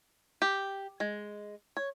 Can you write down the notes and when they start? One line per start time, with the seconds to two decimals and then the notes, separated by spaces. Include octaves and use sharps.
0.42 G4
1.00 G#3
1.77 C#5